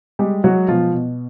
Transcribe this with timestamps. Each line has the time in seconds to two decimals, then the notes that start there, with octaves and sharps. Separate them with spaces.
0.19 G3 G#3 G4
0.44 F#3 G#3 F#4
0.68 B2 F3 F4
0.94 B2